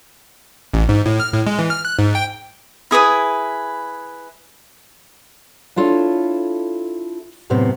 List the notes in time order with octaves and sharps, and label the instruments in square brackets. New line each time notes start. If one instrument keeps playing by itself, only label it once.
[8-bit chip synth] A1
G#2
A2
F6
A2
G#3
E3
F6
F#6
G#2
G5
[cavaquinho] E4 G#4 B4 D#6
[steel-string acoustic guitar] D4 E4 F4 A4 C#5
F#2 A2 C3 B3 C4